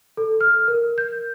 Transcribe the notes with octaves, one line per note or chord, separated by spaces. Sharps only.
A4
F6
A#4
G6